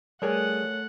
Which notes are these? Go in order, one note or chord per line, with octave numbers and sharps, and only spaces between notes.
G3 A3 G#4 A#4 C#5 F#5 G#5